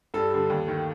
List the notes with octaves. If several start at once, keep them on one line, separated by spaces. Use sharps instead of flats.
G2 A4
D3 G3
D#2
D#3 A3